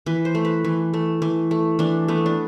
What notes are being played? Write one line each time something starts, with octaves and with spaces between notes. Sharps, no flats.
E3 B4
C5
A3
B4
E3
A3
E3
A3
E3 D4
A3 B3
D4